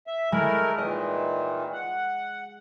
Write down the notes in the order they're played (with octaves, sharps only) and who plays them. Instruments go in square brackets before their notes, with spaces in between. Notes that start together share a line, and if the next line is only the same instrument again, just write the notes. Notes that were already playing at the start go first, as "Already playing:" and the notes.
[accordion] E5
[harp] G#3 [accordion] A3 E4 A#4
[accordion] A#2 D#3 E3 [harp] D#5
[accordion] F#5